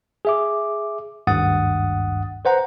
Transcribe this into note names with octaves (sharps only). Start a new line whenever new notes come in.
G#4 E5 D6
G#1 D2 G2 F#5 D#6 A6
B4 C5 F#5 A#5